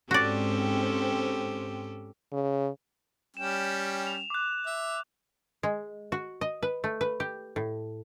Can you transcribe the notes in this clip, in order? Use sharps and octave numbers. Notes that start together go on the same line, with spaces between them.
G#2 C4 C#4 F#4 G4 A4 D5
C#3
G3 C#4 G5 E7
F7
D6 F#6
E5
G#3
F#4
D#5
B4
A3
B4
G4
A2